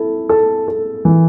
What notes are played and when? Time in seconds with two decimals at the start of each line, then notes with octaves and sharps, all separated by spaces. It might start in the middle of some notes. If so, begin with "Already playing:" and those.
Already playing: E4 A4
0.29 A4
0.68 A4
1.05 E3